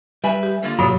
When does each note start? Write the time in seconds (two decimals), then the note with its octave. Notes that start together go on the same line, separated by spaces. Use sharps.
0.24 G3 B4 E5 G#5
0.43 G4
0.63 D3 A#3 F4
0.79 G2 B2 F#3 C#5